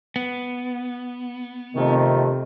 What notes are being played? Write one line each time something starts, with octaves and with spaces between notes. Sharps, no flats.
B3
F2 C3 D#3 A3